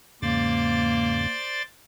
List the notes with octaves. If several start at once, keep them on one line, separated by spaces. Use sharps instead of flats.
E2 G#2 C#3 A#3 C5 D5 A6